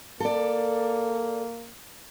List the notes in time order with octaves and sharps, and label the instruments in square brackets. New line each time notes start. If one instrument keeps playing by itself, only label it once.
[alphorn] A#3 [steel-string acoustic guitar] A4 D5